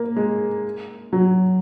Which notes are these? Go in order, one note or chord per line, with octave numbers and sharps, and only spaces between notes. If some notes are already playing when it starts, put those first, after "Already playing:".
Already playing: A#3
G#3
F#3